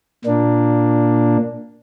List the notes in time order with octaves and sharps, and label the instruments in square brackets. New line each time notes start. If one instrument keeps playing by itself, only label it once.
[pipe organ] A#2 A#3 D4